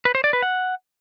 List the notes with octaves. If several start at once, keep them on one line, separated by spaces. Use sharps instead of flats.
B4
C5
D5
B4
F#5